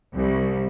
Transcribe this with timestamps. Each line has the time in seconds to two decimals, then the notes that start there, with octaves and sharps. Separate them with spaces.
0.15 C2